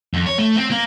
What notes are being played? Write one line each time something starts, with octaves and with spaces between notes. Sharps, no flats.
F2
C#5
A3
C4
A#3